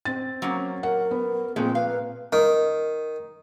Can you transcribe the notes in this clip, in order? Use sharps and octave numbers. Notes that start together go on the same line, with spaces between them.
C4 A6
F#3 A#3 C#4
A#4 F#5
B3
A#2 F3 G#3 A3 C4
B4 F5
D#3